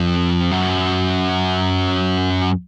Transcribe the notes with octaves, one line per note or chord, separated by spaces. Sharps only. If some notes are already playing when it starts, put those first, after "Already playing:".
Already playing: F2
F#2